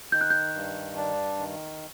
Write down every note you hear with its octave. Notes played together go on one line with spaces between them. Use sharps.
D#3 G6
F#6
G6
G2
D4
D#3